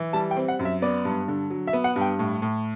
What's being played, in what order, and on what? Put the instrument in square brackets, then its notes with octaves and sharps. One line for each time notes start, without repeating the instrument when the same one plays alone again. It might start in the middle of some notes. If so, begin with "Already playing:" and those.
Already playing: [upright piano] E3
G3 A5
G5
C4
F#5
F#2
E5
B3 D5
G2
D3
F#3
E5
B3
F#5
G2
G5
A2
A2